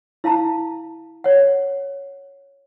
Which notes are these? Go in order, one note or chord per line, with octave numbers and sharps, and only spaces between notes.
E4 F5 A5 A#5
C#5 F#5